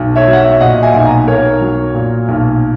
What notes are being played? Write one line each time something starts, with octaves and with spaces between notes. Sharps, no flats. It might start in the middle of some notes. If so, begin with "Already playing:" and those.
Already playing: B1
C#5 E5
F#3
F#5
C#5 E5
A#2 D#5 F#5
E5 G#5
B1
F#5 A#5
B1 A#4 C#5
F#3
A#2
B1